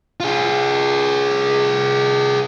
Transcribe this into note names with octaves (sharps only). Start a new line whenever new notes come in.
F4 G#4